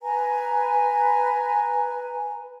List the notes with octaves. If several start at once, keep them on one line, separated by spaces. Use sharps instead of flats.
B4 G#5 A#5